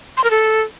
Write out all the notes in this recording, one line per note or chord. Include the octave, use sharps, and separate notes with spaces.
C6
A#4
A4